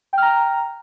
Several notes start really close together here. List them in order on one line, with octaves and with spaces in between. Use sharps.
G5 F6 A#5